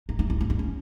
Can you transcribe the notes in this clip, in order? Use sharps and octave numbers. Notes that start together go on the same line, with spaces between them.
D#4
D#4
E4
E4
D#4
C#4